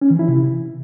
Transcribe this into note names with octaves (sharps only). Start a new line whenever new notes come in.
C#4
E3
E4
C3